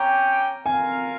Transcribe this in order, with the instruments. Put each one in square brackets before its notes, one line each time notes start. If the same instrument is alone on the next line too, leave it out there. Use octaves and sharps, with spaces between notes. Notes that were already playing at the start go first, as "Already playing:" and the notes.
Already playing: [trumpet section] C#4 G4 C#5 G5 [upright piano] A#5
[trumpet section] F4 A#4 F5 [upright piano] G#5